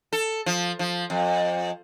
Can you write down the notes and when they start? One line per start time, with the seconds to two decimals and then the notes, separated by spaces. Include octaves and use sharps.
0.13 A4
0.46 F3
0.79 F3
1.10 F2